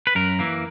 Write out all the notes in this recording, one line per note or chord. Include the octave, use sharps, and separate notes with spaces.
B4
F#2 A#4
E3 A#3